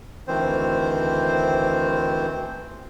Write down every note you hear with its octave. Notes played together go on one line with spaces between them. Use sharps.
D2 D#3 E3 C4 C5